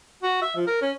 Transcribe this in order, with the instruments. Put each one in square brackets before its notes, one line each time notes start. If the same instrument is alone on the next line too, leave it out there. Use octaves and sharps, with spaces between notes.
[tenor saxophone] F#4
E5
F3
A#4
C#4